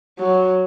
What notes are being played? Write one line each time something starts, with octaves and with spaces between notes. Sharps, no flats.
F#3